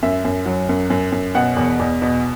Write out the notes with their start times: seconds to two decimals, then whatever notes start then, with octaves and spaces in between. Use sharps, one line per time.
0.03 F#2 E5
0.25 F#2
0.46 F#3
0.69 F#2
0.90 F#2
1.12 F#2
1.35 B2 F#5
1.57 E2
1.79 E2
2.02 B2